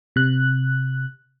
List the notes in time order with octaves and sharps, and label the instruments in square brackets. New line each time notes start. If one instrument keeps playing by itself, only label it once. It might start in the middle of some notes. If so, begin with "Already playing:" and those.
[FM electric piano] C3 F#6